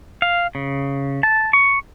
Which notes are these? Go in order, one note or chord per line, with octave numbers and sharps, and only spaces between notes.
F5
C#3
A5
C#6